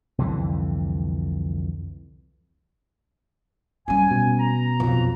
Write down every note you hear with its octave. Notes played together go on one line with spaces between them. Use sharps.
C2 F2 D3 E3
G3 C#4 G#5
B2
A#5
B1 F2